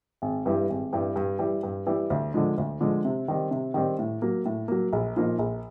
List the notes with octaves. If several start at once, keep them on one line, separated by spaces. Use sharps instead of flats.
G#1
G2 E3 G3
G#1
G2 E3 G3
G2
E3 G3
G2
E3 G3
D2
D3 F3 G#3
D2
D3 F3 G#3
C3
D#3 G3 C4
C3
D#3 G3 C4
A2
F#3 A#3
A2
F#3 A#3
A#1
A#2 F3 A#3 D#4
A#1